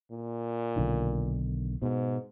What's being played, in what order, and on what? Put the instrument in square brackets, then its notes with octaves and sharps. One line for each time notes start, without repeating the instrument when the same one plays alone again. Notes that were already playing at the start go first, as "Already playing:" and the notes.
[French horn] A#2
[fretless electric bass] B1 D3 D#3
[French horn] G#2 [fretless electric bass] B2